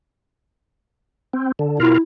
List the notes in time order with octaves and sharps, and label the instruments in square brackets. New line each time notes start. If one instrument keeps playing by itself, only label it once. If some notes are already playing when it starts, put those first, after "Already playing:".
[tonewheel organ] C4
D3
[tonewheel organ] B2 F4 A#4 [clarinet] E4